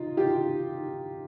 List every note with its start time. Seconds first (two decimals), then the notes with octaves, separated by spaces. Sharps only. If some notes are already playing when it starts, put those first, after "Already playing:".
Already playing: D#4 F4
0.17 F4 G4